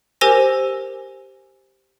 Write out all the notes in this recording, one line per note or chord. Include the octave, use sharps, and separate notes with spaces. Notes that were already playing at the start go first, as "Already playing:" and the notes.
G4 A#4 C5 G#5 E6 A#6